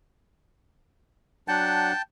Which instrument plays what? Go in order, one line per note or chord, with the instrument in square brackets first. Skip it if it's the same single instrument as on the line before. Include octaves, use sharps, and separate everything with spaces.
[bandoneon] F#3 D4 F#5 [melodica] G5 A5